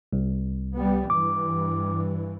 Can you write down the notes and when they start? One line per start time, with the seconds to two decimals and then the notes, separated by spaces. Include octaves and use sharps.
0.13 C2
0.75 G3 B3
1.10 G2 E3 D6